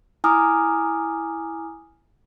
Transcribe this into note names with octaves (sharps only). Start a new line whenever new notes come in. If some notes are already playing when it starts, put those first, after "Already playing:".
E4 G#5 A#5 D6 D#6 F6